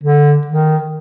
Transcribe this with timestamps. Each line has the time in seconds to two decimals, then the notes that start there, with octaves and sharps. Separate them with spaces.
0.03 D3
0.47 D#3